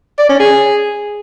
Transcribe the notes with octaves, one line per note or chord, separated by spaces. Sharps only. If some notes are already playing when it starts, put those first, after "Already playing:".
D5
C#4
G#4